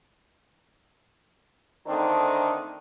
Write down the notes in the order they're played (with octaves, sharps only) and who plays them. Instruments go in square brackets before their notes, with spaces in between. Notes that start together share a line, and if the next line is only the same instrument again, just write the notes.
[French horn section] D3 D#3 A3 C4 D4 D#4